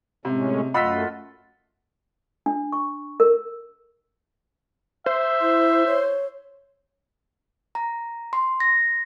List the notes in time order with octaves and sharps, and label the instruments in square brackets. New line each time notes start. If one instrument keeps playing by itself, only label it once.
[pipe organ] A2 G#3 C#4 [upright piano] C3
[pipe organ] F#2 A3 [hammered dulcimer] F4 D#5 F#5 [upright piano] B5 E6 B6
[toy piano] D4
C#6
A#4
[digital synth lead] C5 [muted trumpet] E5
[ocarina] E4
C#5
[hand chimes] A#5
C6
A#6